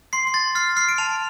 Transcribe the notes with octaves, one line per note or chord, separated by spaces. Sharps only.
C6 C7
C7
C6 A6
F6 C7
F6 C7
D7
A5 F7